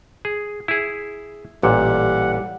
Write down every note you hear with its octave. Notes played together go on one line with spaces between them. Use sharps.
G#4
E4 G#4
A1 A#2 G3 F#5